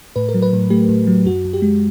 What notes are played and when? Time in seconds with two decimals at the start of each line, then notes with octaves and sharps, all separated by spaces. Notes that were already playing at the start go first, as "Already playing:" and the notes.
0.16 A2 B4
0.29 A#4
0.34 F#3
0.42 B4
0.53 A2
0.70 A3 G4
0.89 A2
1.07 F#3
1.25 F#2 F#4
1.45 F#2
1.53 G4
1.62 G#3